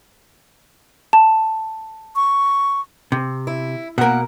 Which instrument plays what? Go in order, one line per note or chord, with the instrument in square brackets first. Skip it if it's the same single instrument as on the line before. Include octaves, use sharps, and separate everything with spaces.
[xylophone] A5
[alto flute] C#6
[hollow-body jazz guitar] C3
[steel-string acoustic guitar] E4
[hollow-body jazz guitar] B2 A#4 [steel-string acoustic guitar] A#3 F#5